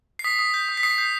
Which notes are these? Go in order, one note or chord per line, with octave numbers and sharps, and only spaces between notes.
C7
D#6 B6
D#6
G6
D#6
B6
D#6 C7
G6